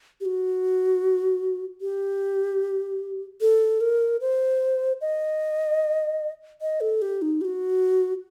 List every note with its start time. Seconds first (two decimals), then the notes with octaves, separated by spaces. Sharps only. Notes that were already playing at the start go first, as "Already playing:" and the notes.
0.21 G4
0.26 F#4
1.81 G4
3.41 A4
3.81 A#4
4.21 C5
5.01 D#5
6.61 D#5
6.81 A4
7.02 G4
7.22 D#4
7.41 G4
7.45 F#4